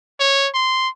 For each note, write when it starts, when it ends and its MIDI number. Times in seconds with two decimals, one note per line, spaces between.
0.20 0.49 73
0.54 0.89 84